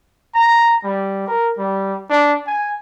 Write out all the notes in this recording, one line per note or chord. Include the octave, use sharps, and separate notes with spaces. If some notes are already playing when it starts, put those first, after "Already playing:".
A#5
G3
A#4
G3
D4
G#5